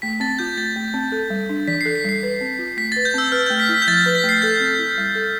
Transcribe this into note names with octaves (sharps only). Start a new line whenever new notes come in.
A3 B6
C4 A6
F4 G6
A3 A6
A3
C4
A4
G3
D4
E3 B6
C7
A4
B6
G3 C7
B4
C4
F4
A3 B6
A6
B4
G6
C4 E6
B4 F6
G6
A3
B6
E4
B6
G6
F3 A6
B6
B4
B6
A3
C7
A4 G6
C4
E4
G3
A4